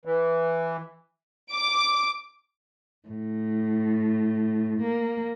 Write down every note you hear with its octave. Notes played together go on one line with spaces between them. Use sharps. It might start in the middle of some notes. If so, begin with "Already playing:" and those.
E3
D6
A2
A#3